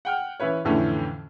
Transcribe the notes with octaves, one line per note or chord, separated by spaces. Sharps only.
F#5 G5 F6
E3 C#4 E4 B4 C#5
F2 A2 D3 E3 A3 C#4